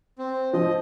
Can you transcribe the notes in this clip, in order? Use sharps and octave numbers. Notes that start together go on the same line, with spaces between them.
C4
F3 D#5